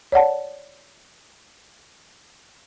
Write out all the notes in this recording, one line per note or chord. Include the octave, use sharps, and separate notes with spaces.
C#5 D5 F#5 A5